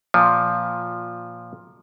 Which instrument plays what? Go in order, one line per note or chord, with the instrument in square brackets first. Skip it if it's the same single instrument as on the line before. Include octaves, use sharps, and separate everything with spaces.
[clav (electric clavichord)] A#2 F3